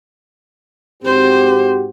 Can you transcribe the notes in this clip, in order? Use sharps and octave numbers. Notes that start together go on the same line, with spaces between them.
G#2 C4 F#4 G4 C5